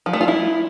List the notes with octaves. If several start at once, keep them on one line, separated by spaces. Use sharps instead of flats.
F3
A3
F4
E4